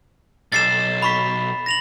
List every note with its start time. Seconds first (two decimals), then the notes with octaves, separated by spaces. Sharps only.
0.52 B1 A6 C7 E7
1.02 B5 C#6 B6
1.66 A#6 F7 F#7